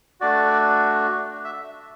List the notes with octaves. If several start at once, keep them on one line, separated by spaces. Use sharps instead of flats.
A3 D4 F#4 D5
E5